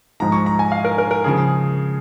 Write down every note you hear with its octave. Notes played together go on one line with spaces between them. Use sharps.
G#2 F3 G#3 A#5
C#6
A#5
G#5
F5
A#4
A#4
A#4
C#3 F3 G#4